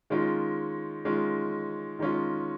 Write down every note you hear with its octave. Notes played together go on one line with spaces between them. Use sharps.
D#3 G#3 C#4 F4
D#3 G#3 C#4 F4
D#3 G#3 C#4 F4